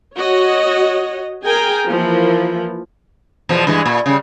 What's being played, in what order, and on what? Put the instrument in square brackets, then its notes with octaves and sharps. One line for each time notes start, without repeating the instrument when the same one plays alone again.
[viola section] F#4 C#5 D#5
G#4 A#4 G5 G#5 A#5
E3 F3 A#3
[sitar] E2 B2 F3
G2 E3 G#3
A#2
C#3 G3